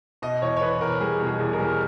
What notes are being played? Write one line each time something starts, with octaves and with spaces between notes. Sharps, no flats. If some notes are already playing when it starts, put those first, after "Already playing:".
B2 D#5
E2 C#5
C#5
E2 B4
E2 A#4
G3 G#4
B2
G#4
E2
A#4
G3 G#4
A#4